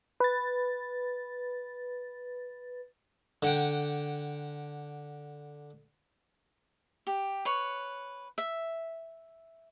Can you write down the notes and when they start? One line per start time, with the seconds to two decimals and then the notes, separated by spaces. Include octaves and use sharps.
0.20 B4 A6
3.42 D3 F#5 G5
7.07 G4
7.45 B4 C#5
8.38 E5